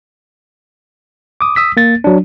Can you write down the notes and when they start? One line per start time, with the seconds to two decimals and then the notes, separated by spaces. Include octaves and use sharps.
1.41 D6 D#6
1.56 D#6 E6 B6
1.77 A#3 A6
2.04 F#3 D4